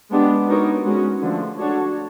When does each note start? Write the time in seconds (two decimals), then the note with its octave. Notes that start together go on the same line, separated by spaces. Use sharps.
0.11 G#3 B3 D4 G4
0.48 B3 D#4 F#4 A#4 C#5
0.85 G#3 C#4 F#4
1.22 D3 F3 A3
1.59 D4 F#4 A4 C#5